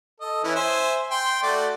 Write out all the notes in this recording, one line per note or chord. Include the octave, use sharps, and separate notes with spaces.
A4 D#5
E3 C#4 E4
C5 E5 G#5
G5 C6
A3 F#4 D5